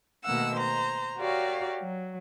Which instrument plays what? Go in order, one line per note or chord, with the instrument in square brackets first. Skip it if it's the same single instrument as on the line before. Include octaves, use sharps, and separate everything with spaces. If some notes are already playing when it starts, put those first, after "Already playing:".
[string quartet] B2 D#3 A3 A#3 F#5 E6
C5 A#5
F#4 G4 A#4 C#5 D5 F5
F#3